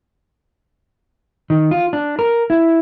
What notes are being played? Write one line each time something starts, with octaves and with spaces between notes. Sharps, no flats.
D#3
F4
D4
A#4
E4